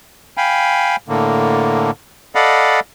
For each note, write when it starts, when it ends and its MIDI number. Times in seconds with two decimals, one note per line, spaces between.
0.37 0.96 77
0.37 0.96 79
0.37 0.96 80
0.37 0.96 83
1.08 1.91 45
1.08 1.91 50
1.08 1.91 58
2.35 2.80 69
2.35 2.80 74
2.35 2.80 75
2.35 2.80 77
2.35 2.80 78
2.35 2.80 83